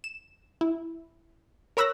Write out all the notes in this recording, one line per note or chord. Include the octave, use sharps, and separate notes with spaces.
E7
E4
A#4 C#5 B5 E6 F#6 A#6